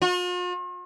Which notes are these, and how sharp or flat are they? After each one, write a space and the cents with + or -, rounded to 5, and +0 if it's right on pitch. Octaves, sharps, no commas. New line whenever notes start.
F4 +45